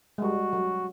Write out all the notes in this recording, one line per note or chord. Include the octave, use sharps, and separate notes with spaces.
G#3
G3 F#4
F#3